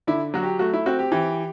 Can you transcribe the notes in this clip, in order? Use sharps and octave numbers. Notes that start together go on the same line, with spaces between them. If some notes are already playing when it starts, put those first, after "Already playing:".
D3 E4
F#3 F#4
G4
A3 F#4
E4
C4 F#4
G4
E3 G4